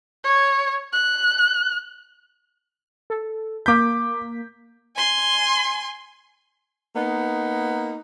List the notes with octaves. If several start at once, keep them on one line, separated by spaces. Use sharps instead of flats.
C#5
F#6
A4
A#3 D6 G6 B6
G#5 C6
A#3 B3 D#4